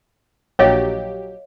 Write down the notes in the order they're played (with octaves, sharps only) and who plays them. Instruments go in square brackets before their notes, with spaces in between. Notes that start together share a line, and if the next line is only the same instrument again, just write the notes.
[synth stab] A#1 F#3 G4 [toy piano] C#5 D#5 F5